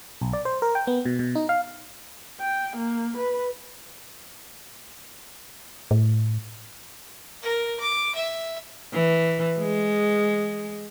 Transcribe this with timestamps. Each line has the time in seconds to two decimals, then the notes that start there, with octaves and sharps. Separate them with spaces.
0.21 B1
0.33 D5
0.45 C5
0.62 A#4
0.75 G5
0.87 B3
1.05 B2
1.19 B2
1.35 D#4
1.49 F5
2.40 G5
2.76 A#3
3.17 B4
5.91 A2
7.43 A#4
7.80 D6
8.15 E5
8.93 E3
9.60 G#3